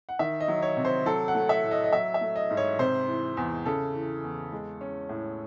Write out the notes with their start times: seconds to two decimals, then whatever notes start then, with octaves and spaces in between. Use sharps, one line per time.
0.09 F#5
0.19 D#3 E5
0.40 D#5
0.48 F#3
0.62 C#5
0.77 C3
0.85 C5
1.06 F#3 A4
1.28 F#5
1.35 A3
1.49 E5
1.63 A2
1.71 D#5
1.84 D#5
1.93 F#3 E5
2.14 E5
2.21 A3
2.36 D#5
2.50 G#2
2.57 C#5
2.79 C3 C5
3.07 E3
3.37 E2
3.65 C#3 A4
3.94 E3
4.24 E2
4.52 G#3
4.81 C#4
5.09 A2